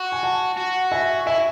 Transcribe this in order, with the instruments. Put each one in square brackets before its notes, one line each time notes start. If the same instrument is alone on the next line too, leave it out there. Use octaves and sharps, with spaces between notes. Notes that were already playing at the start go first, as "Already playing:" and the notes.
Already playing: [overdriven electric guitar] F#4
[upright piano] G#5
F#5 A5
[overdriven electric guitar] F#4
[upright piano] E5 G#5
[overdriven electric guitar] E4 [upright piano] E5 G#5